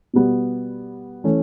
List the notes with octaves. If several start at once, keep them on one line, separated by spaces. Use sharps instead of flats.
B2 G3 B3
E3 A3 C#4